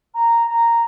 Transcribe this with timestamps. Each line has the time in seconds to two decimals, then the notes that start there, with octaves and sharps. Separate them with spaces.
0.14 A#5
0.47 A#5